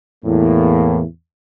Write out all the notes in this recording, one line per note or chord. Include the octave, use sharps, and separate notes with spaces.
E2 A2 A#3